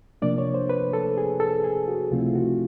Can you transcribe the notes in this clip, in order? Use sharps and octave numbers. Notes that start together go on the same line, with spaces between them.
C3 F3 A#3 D4 D5
C#5
C5
B4
A4
G#4
A4
G#4
F#4
C#2 C3 F3 A3 C4 F4
E4
F4
F#4